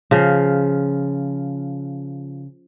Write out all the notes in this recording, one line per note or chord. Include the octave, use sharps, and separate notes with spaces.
C#3 F3